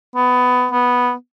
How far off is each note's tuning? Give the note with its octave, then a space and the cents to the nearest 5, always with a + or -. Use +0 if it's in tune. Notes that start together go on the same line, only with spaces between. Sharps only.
B3 +15
B3 -5